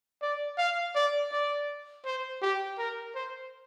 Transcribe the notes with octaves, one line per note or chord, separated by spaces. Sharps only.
D5
F5
D5
D5
C5
G4
A#4
C5